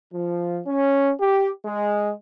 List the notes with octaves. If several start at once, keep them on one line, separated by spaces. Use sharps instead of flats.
F3
C#4
G4
G#3